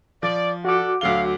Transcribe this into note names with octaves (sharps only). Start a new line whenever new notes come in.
F3 D5
F#4 A4 D5 F#5 D6
D2 F#3 F5 G7